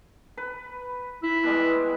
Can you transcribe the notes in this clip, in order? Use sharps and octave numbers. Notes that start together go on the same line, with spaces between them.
B4
E4
B2 G3 G#3